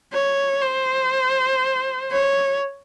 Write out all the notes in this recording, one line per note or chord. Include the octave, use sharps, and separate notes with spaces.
C#5
C5
C#5